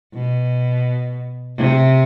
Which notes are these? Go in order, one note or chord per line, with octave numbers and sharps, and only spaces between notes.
B2
C3